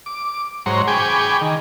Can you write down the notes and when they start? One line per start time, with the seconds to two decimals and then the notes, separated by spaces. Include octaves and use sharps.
0.06 D6
0.66 G#2 F#3 C5 C#5 A#5
0.87 G#4 G5 G#5 B5 C#6 D6
1.41 D#3